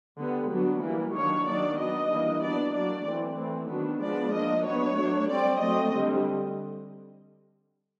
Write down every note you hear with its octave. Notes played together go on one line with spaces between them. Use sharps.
D3 G3 B3
F#3 B3 D4
E3 G3 A#3
D#3 F#3 A#3 D4 C#5
D#3 F#3 A#3 D4 D5
F#3 B3 D4 D#5
E3 G3 A#3 D4
F#3 B3 D4 D5
F#3 A#3 D4 D5
E3 A3 C4
E3 A3 C4
D#3 F#3 B3 D4
F3 G#3 B3 D4 D5
F3 A#3 D4 D#5
F#3 B3 D4 C#5
F#3 A3 D4
G3 C4 D5
F#3 A3 C4 D#5
D3 G3 C4